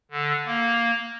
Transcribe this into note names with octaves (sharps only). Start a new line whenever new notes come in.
D3
A#3